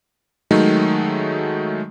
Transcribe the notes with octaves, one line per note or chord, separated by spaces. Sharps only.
D#3 F#3 G#3 A3 D#4